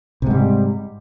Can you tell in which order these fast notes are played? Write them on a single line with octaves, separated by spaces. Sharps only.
C3 G#2 G3